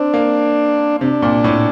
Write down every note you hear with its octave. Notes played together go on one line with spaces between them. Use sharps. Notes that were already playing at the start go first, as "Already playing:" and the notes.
Already playing: C4 D4
A#3
C3 D4
A#2
A2